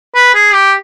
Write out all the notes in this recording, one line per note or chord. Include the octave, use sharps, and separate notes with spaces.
B4
G#4
G4